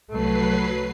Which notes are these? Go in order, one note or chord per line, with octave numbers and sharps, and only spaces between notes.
C2 F#3 A3 B4 C7